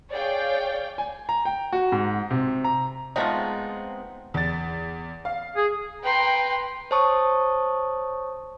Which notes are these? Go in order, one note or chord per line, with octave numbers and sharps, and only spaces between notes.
G#4 C#5 D5 F5 G5
G#5
A#5
G5
F#4
G#2
C3
A#5
F3 G#3 A3 B3 C4 D#4
E2 A6
F5
G#4
B4 G5 A#5 C6
C5 C#5 A5 C#6 D#6